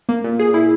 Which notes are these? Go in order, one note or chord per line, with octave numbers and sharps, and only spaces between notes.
A#3
A#2
G#4
E4